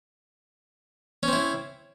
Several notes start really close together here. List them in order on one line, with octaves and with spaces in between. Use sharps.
C#4 C4 E4